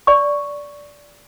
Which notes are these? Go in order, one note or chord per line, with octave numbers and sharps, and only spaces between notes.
D5 C#6